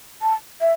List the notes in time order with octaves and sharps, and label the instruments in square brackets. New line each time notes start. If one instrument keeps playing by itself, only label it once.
[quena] A5
E5